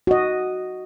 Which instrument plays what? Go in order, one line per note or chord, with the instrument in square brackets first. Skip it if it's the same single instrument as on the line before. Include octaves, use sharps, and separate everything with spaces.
[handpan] F#4 D#5